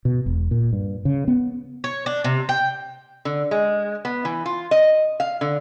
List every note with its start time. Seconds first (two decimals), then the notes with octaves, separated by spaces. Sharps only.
0.05 B2
0.26 E1
0.51 A#2
0.73 G2
1.05 C#3
1.28 B3
1.84 C#5
2.06 D4
2.24 C3
2.49 G5
3.25 D3
3.51 G#3
4.05 B3
4.25 E3
4.46 F4
4.71 D#5
5.20 F5
5.41 D3